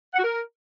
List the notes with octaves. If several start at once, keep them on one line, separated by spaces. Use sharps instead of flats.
F#5
F#4
A#4